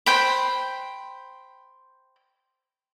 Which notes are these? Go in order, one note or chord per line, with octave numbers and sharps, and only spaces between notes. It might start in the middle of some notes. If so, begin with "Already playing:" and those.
C5 G5 B5